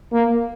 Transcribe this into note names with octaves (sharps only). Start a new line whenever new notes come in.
A#3